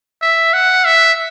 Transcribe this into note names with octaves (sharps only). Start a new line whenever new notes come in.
E5
F#5
E5